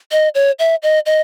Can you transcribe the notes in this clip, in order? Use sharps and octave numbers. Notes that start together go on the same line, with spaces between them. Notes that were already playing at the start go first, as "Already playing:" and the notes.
D#5
C#5
E5
D#5
D#5